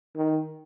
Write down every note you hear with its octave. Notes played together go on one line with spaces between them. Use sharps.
D#3